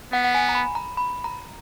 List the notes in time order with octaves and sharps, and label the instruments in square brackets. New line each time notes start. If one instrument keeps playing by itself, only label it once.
[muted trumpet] B3 [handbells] F#5
[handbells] F#5
G#5
A#5
B5
A#5
B5
A#5